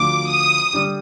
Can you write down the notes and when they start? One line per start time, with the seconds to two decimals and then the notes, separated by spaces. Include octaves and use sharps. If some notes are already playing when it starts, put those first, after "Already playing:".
Already playing: D2 D3 F3 D6
0.29 D#6
0.73 D3 G3 D4 G4